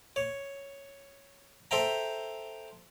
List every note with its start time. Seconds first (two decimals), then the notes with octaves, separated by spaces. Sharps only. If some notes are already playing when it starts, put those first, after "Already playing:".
0.16 C#5
1.71 A4 C5 E5 G5 A#5